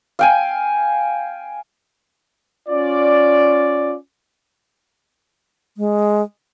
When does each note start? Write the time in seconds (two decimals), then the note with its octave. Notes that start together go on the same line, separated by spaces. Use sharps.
0.19 F5 G5 G#5
2.68 C#4 F4 D5
5.77 G#3